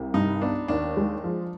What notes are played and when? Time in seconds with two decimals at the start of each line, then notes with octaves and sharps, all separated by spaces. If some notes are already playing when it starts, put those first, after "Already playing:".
Already playing: C2
0.14 G2 D#4
0.41 B3 D4
0.68 D#2 D4
0.97 G#3
1.24 F3